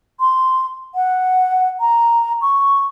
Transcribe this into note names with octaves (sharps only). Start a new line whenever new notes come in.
C6
F#5
A#5
C#6